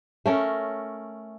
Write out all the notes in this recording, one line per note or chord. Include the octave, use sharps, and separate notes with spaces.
A3 C#4 A#4